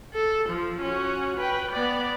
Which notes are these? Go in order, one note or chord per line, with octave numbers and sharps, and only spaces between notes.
A4
F3
C#4 F#4
B4 G5
B3 D5